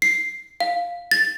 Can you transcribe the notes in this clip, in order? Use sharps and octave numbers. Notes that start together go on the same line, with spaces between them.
C7
F5
A6